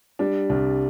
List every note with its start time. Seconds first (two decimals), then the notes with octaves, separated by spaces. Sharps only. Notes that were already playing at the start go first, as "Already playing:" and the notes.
0.19 G3 D4
0.50 C2 D4